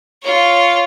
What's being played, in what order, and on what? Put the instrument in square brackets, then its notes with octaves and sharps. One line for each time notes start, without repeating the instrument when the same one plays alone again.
[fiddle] F4 C#5